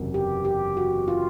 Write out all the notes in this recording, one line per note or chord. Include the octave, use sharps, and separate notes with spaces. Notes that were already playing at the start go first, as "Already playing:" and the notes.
Already playing: F#1 E2 C3 E3
G4
G4
F#4
F4